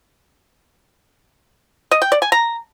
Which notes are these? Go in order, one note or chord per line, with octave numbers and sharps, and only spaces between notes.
D#5
G5
D5
G#5
A#5